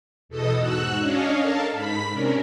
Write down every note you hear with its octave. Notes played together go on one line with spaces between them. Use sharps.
E2 B2 A4 D#5 D#6
G#2 F#4 E6 F#6
C#4 D4 C#5 D#5 F5
A4 A#4 F5 A5
G#2 B5 B6
C3 C#4 D4 A#4